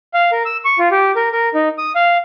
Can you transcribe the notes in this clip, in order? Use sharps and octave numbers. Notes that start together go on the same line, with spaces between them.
F5
A#4
E6
C#6
F4
G4
A#4
A#4
D#4
D#6
F5